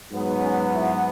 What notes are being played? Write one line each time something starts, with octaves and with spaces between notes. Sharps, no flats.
G#2 F#3 B3
C#4
E4